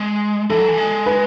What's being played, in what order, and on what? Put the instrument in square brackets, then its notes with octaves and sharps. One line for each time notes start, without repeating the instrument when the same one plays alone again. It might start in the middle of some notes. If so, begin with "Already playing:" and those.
Already playing: [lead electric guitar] G#3
[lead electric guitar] E3 [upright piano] A4
[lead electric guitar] F#3
E3
G#3
[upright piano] B4